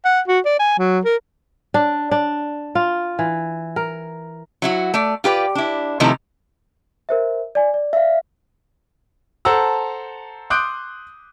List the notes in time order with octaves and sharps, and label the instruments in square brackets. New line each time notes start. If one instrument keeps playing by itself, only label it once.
[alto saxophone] F#5
F#4
D5
G#5
F#3
A#4
[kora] D4
D4
F4
E3
A#4
[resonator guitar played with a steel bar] F#3 E4 F#4
A3 D5
F4 G4 B4 D5
D4 E4
C3 D#3 F3 A3 D#4 E4
[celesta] A#4 C5 E5
D5 G#5
D5
[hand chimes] E5 F5
[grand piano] A4 C5 F#5 A5 A#5 E6
C6 D6 D#6 F#6 G6 D7